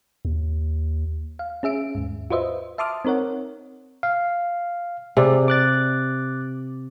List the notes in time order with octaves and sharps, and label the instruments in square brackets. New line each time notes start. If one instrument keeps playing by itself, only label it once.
[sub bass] D#2
[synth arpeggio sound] F5
C#4 G#4 E5 D7
D#2 G#2
F4 F#4 B4 C5 D#5 E5
E5 A5 C6 D6 D#6 F6
C4 D#4 A#4 C#5 F#5
[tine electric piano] F5
[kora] C3 [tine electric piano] G#4 D5
[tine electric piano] D6 F#6 A6